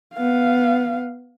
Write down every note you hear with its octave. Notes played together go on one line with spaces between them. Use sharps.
B3 F5